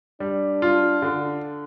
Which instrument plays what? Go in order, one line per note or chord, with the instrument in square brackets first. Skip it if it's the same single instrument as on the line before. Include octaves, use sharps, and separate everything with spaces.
[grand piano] G3 [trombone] D4
[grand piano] F4
D3